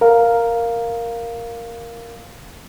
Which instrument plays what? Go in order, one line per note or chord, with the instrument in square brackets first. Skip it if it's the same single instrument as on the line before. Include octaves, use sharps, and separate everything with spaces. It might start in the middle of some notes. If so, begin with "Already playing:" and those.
[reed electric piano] A#4 F5